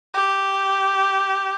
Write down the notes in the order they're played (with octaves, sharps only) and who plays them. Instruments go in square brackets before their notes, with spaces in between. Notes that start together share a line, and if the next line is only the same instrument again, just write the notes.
[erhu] G4